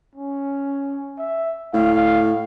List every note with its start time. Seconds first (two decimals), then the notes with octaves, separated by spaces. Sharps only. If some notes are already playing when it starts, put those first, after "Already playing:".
0.15 C#4
1.18 E5
1.73 A2 F5